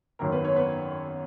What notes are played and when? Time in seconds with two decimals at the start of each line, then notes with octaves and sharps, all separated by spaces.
0.19 G#1 F#2 D#3 F#3 A#3 A#4
0.32 B3 B4
0.44 C#4 C#5
0.56 B3 B4